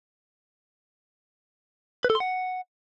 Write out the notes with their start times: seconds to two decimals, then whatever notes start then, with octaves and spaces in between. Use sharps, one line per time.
2.04 B4
2.10 A4
2.15 C6
2.20 F#5